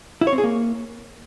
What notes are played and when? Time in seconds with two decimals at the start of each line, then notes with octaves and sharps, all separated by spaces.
0.21 E4
0.27 C#5
0.32 C4
0.38 G#4
0.44 A#3